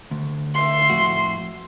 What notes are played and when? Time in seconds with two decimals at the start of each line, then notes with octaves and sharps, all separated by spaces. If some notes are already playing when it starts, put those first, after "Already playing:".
0.11 D2
0.55 E5 C6
0.90 F2 A2 F#4